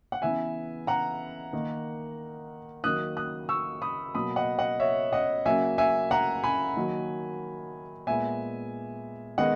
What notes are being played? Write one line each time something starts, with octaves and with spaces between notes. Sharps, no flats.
F#5
C#3 E3 B3 E5 G#5
F#5 A#5
D#3 A#3
D#3 F#3 A#3 D#6 F#6
D#6 F#6
C#6 E6
B5 D#6
B2 F#3 A#3 B5 D#6
D#5 F#5
D#5 F#5
C#5 E5
D#5 F#5
C#3 F#3 A#3 E5 G#5
E5 G#5
F#5 A#5
G#5 B5
D#3 F#3 A#3
A#2 G#3 B3 E5 G#5
D#3 G#3 B3 D#5 F#5